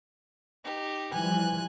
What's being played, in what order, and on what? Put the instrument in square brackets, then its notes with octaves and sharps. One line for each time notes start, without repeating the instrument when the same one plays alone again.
[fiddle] D#4 G4
[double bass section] E3 F3 G3 [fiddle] G#5 F#6